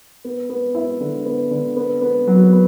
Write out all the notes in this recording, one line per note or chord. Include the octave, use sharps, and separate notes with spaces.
B3
B3
E4
D3
B3
D3
B3
B3
F#3
B3